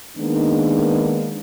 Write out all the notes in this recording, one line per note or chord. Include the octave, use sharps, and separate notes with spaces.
D#3 G#3 A#3 B3 D4 D#4